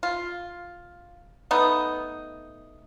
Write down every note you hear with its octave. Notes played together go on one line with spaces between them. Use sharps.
F4
A3 B3 D#4